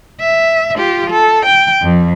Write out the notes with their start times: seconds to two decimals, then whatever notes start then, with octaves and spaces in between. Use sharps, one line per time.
0.21 E5
0.76 F4 G4
1.11 A4
1.46 G5
1.82 F2